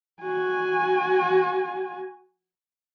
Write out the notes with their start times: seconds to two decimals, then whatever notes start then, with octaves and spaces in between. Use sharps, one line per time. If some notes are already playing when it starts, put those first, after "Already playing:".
0.22 F#4 G#5